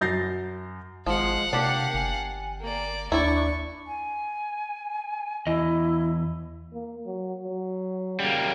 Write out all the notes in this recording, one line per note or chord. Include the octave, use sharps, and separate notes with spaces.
F#2 G6 A6 A#6 C7
G#1 F3 G#3 F5 F#5
C3 A#3 D4 G4
G1 G#5
A#3 D5
D#2 D4 E4 D5 C#6
G#5
E2 E4 D#5
A#3
F#3
F#3
C#3 G3 A#3